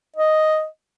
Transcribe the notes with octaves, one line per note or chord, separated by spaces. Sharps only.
D#5